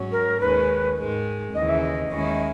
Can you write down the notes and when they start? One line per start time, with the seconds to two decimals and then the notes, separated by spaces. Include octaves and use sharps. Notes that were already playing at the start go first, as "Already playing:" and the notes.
Already playing: G#2 F#3 C#4
0.12 A#4
0.41 D#2 D#3 G#3 C#4 B4
0.97 G#2 D#3 G#3
1.55 D#2 C#3 E3 D#5
1.69 E5
1.83 D#5
2.12 D#2 D#3 G#3 C#4 E4